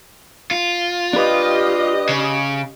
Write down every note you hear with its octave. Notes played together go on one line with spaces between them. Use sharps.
F4
D4 G4 B4 D#5
C#3